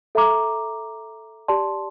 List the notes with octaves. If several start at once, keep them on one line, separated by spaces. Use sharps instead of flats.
A4 E5 A#5 D6
G4 D5 A5 C6